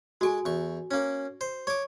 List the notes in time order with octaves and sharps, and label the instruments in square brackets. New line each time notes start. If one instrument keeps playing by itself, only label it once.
[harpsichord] G#3 C#6 [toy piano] F#4 A4 G#5
[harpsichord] E2 C#6
A#3 C#4
C5
[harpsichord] C#5 D6 [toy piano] C#6